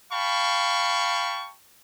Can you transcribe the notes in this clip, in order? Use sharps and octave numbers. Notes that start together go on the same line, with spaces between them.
F5 G5 A5 B5 C#6